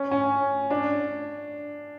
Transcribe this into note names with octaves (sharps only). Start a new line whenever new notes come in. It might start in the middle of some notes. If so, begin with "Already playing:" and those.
Already playing: C#4
C#4
D4